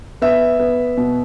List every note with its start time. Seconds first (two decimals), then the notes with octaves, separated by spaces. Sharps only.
0.22 B3 E5
0.59 B3
0.97 B2